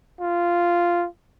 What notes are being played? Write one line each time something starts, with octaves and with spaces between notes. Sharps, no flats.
F4